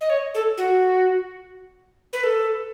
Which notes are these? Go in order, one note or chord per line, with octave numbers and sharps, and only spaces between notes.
D#5
C#5
A4
F#4
B4
A4